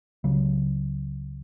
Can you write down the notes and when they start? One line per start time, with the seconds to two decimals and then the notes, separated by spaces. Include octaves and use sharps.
0.24 C#2 C#3 F#3